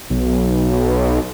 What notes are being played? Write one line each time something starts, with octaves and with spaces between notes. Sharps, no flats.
B1